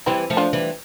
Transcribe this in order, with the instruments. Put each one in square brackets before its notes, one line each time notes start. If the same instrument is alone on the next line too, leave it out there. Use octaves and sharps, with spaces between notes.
[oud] E3 G3 [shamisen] C4 E4
[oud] F3 A3
[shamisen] D4 F4
[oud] E3 G3